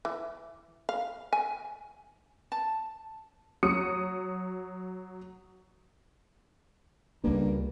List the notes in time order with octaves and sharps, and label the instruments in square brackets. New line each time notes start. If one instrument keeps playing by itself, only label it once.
[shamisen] E3
F5
G#5
[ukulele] A5
[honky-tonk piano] F#3 D#6 C#7
[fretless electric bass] C#2 A#3 [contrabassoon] G2